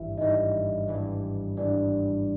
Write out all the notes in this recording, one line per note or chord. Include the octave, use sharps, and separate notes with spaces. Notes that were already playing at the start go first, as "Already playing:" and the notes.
Already playing: G#1 G2 E3 G3 E4 E5
G#1 G2 E3 G3 D#4 D#5
G#1 G2 E3 G3
G#1 G2 E3 G3 D4 D5